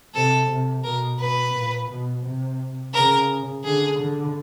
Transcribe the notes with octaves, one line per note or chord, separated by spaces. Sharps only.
C3 A4
C3
B2 A#4
B2 B4
A#2
B2
C3
C#3 A#4
D3 G#4
D3